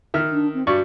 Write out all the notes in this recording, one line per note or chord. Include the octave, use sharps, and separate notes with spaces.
D#3 E5 F6
D4
C4
G2 F#4 D5 C#6